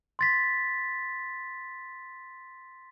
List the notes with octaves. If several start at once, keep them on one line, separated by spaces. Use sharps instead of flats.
C6 A6 B6